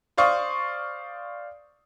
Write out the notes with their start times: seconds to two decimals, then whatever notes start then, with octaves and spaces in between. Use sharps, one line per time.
0.17 C5 D5 F5 C#6 D#6